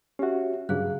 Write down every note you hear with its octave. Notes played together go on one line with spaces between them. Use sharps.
C#4 F#4 G4 E5
G2 C#3 F#3 G#4 F5 F#6